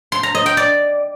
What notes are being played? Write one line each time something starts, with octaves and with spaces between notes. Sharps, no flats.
C6
A#5
D#5
G5
D5